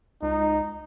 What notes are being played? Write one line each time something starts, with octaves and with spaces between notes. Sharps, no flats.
C#2 D#4